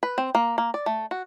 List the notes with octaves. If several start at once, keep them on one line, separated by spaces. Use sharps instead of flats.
B4
C4
A#3
A#3
D5
A3
F#4